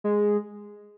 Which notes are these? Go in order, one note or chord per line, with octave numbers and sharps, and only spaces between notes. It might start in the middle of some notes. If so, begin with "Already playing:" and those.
G#3